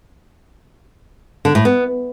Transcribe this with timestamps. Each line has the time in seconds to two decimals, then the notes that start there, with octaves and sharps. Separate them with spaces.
1.45 D3
1.55 A2
1.65 B3